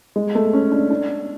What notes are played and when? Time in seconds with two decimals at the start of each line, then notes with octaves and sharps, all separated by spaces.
0.16 G#3
0.35 A3
0.53 C#4
0.72 D4
0.91 D4